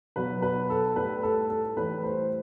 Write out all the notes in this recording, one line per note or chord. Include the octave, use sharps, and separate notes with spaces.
B2 F#3 B4
B4
A4
A2 G3 B4
A4
A4
A2 E3 G3 B4
C5